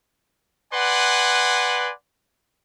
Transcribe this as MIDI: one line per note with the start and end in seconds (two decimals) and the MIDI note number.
0.72 1.91 71
0.72 1.91 74
0.72 1.91 78
0.72 1.91 80
0.72 1.91 84